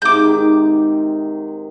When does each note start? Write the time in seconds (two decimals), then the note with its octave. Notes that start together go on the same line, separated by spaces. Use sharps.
0.02 G#2 C3 D6 G6
0.24 D#3